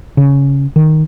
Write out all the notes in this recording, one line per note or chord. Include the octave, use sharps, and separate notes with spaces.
C#3
D#3